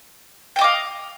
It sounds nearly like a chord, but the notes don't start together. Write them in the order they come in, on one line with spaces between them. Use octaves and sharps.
G5 D#5 D6 F5